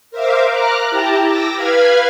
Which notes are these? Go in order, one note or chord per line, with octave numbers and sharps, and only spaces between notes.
A#4 C5 E5 F5 D6
A#5 D6 F6 F#6
E4 G4 G5 A5 A#5
D6 E6 A#6
B4 F5 B5 F6 G#6